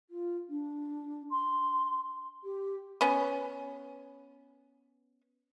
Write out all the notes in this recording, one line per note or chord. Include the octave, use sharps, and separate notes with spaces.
F4
D4
C6
G4
B3 C#4